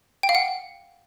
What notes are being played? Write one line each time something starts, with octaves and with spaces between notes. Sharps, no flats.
G5
F5
F#5